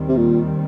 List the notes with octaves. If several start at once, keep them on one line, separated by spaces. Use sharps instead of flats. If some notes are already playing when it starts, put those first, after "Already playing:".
Already playing: D#2 D#3 G3 C4
C3
A#2